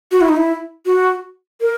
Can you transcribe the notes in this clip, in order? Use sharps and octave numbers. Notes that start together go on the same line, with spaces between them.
F#4
E4
D#4
E4
F#4
A#4